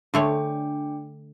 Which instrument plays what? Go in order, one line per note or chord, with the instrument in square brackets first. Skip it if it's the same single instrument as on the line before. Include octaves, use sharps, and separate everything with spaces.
[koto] D3 A3 C#5 [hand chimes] D4 G5 D6